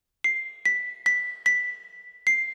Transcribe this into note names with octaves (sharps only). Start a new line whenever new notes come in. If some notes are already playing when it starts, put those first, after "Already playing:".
C7
B6
B6
B6
C7